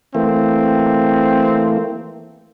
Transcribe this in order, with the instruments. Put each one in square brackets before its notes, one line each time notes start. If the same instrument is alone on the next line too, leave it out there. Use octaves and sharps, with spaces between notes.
[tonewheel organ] E3 A3 A#3 [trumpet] C4